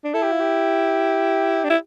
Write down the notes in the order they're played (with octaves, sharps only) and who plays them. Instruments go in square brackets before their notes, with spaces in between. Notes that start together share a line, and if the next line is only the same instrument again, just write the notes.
[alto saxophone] D4
[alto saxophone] E4 [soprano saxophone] A4
[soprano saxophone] G4
F4
G4
[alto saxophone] D4
E4